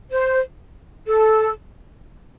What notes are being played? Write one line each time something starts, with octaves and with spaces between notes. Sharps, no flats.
C5
A4